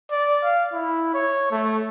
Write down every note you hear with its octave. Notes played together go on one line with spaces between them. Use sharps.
D5
F5
E4
C#5
A3